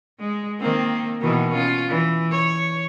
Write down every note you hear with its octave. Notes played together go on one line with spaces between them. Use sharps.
G#3
D#3 A#3 C4
B2 D#3 E3
C#4 F4
E3
C#5